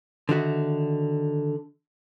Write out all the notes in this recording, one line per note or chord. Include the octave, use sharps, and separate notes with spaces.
D3 D#3 F#4 E5